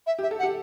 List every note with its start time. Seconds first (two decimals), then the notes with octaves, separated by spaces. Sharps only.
0.07 E5
0.19 G4 E5
0.31 A4
0.39 F#5
0.43 G4